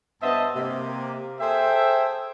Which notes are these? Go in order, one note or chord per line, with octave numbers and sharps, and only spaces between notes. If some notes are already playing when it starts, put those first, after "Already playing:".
G2 B3 C5 D#5 E5 A5
C3 A#3
G#4 A4 C5 E5 G5